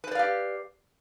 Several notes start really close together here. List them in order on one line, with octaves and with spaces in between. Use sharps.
B4 C5 D5 F5 G4